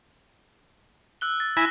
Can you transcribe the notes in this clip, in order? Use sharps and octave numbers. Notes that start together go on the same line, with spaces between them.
E6 F#6 G7
A6
E4 G#5 B5 A#6 B6